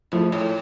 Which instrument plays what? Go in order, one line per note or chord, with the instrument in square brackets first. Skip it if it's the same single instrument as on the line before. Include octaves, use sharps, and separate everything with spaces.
[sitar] G#2 [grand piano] F3 A3 E4
[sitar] A2